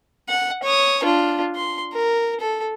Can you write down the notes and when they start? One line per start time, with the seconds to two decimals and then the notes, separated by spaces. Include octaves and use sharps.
0.29 F#5
0.63 C#5 D#6
1.04 D4 F4
1.56 C6
1.93 A#4
2.40 A4